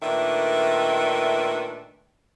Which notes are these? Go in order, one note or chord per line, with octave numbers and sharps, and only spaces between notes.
A#2 D#3 A3 D4 B4 E5